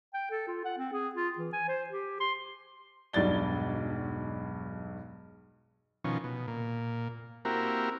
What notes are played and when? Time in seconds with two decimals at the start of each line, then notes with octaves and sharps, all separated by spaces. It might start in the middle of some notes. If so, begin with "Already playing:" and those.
0.14 G5
0.31 A4
0.47 F4
0.65 F#5
0.78 C4
0.92 G#4
1.15 F4
1.39 E3
1.53 G#5
1.68 C5
1.89 G4
2.20 C6
3.13 E1 B1 G2 D5 A6 G7
6.04 B2 D#3 F3 C#4
6.24 B2
6.48 A#2
7.45 A#3 C4 E4 F#4 G4 A#4